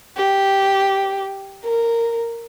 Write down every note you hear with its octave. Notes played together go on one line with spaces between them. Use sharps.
G4
A#4